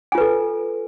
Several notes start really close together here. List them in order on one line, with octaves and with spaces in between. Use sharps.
G#5 F4 B4 A4